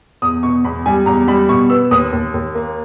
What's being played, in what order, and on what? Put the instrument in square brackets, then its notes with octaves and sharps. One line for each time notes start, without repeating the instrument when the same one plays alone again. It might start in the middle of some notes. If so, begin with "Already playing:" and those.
[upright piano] E2 D#6
B2 C#6
E2 B5
G3 G#5
E2 A#5
G3 B5
B2 C#6
B3 E6
D#2 D#6
D#2
D#2
A#3